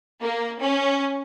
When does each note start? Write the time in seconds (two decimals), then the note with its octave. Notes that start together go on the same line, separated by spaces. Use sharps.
0.21 A#3
0.62 C#4